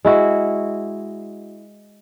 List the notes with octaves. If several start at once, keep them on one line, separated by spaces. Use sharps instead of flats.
G#3 E4 F#4